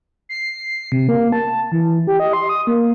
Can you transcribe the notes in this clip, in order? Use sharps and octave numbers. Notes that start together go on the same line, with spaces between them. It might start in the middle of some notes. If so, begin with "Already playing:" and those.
C7
C3
A#3
A5
E3
G4
D#5
C6
D#6
A#3